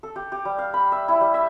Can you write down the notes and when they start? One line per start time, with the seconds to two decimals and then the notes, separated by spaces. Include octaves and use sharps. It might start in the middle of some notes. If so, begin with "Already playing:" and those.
0.03 A4
0.16 G4
0.32 G4
0.45 G3
0.58 F5
0.74 B5
0.92 E5
1.08 E4
1.21 G3
1.34 E5